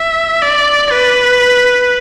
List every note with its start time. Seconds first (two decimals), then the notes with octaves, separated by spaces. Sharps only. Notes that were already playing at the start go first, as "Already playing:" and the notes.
Already playing: E5
0.42 D5
0.91 B4